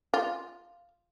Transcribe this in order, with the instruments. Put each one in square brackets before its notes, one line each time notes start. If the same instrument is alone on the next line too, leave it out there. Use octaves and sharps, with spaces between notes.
[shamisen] F4